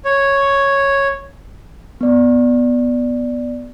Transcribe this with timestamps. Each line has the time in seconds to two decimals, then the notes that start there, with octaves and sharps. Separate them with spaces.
0.05 C#5
2.01 B3 D5